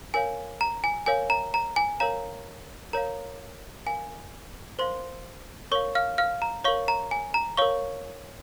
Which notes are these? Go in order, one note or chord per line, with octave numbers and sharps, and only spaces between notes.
A#4 C#5 F5 G#5
A#5
G#5
A#4 C#5 F5 G#5
A#5
A#5
G#5
A#4 C#5 F5 A#5
A#4 C#5 F5 A#5
A#4 F5 G#5
A#4 C5 F5 C6
A#4 C#5 F5 C#6
F5 F6
F5 F6
A#5
A#4 C#5 F5 C#6
A#5
G#5
A#5
A#4 C#5 F5 C#6